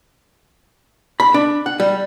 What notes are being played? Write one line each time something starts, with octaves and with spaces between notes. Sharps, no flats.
B5
D4
F#5
G3